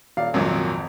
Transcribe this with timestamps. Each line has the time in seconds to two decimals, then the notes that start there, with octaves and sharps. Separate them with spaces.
0.17 D#1 D5 F5
0.34 G#1 F2 A#2 F#3